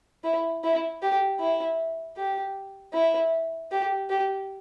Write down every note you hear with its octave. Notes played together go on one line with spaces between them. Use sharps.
E4
E4
G4
E4
G4
E4
G4
G4